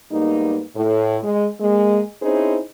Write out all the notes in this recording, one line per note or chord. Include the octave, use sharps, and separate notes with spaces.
G#2 G3 A#3 B3 D#4
A2
G#3
G#3 A#3
C4 C#4 D#4 E4 G#4 C5